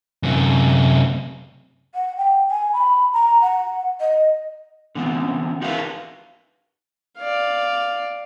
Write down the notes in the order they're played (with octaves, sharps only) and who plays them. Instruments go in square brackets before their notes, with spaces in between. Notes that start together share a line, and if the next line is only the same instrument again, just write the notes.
[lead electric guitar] F#2 C3
[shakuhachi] F#5
G5
G#5
B5
A#5
F#5
D#5
[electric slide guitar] D3 E3 B3 C4
D#4 F#4 A#4 B4 E5 F5
[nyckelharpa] D5 F5